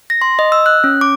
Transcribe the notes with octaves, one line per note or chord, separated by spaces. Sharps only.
A#6
C6
D#5
E6
F#6
C#4
D6